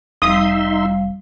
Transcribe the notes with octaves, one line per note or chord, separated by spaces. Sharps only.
F1 G3 D#4 E5 F5 C6 D#6